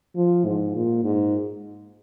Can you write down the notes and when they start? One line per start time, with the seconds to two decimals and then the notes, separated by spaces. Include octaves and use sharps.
0.16 F3
0.46 G#2
0.76 A#2
1.04 G#2